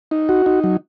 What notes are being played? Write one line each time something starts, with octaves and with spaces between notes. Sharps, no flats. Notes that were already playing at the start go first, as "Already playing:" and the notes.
D#4
F#4
D#4
F#3